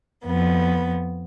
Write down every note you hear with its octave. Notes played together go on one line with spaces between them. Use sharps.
F2 B3